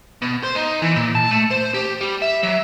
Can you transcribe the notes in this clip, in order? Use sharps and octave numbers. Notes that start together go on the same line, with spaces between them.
B2
C5
D#4
E3
A#2
A5
A3
C5
G4
G3
E5
F#3